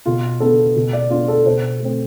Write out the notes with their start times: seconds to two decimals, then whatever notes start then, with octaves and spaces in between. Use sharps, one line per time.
0.06 B2 F4
0.40 B3 D4 A4
0.76 B2
0.93 D5
1.11 B3 D4 F4
1.28 A4
1.46 B2 C5
1.80 A3 C4